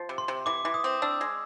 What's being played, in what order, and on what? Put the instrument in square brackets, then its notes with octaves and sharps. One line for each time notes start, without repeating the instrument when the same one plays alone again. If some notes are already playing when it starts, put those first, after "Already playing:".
Already playing: [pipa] F3
C3
[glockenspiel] C6
[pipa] C3
[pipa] E3 [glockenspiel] D6
[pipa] E3
[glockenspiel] D#6
[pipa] C4
[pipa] D4 [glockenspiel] E6
[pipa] G#3